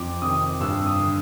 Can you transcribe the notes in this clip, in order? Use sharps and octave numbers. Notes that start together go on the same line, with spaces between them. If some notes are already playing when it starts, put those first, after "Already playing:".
Already playing: F2 D6
C3 D#3 D#6
G2 E6
D#6
D3